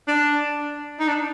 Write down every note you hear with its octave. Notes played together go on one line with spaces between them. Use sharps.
D4
D#4
D4